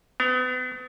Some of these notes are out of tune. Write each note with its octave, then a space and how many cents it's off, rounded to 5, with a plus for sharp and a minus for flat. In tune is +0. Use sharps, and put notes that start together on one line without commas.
B3 +35